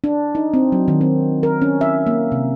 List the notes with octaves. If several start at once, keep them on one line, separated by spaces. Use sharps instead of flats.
D4
D#4
C4
F#3
D#3
C4
A#4
C#4
E5
A#3
C3